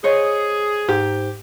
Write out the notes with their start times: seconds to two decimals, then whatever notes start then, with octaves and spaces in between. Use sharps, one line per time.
0.04 G#4 C5 C#5 D#5
0.89 G#2 G4